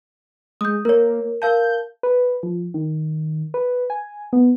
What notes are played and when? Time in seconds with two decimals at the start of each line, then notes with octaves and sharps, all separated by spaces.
0.61 G#3 D#6 G6
0.85 A#3 A#4 C#5
1.42 A#4 F5 A5 G6
2.03 B4
2.43 F3
2.74 D#3
3.54 B4
3.90 G#5
4.33 B3